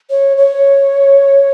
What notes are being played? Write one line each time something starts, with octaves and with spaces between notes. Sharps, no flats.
C#5
C#5